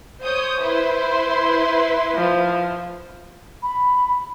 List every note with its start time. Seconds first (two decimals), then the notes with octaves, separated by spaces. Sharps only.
0.23 C5 C#5 D#6 G6
0.61 E4 B4 C6
2.15 F3
3.63 B5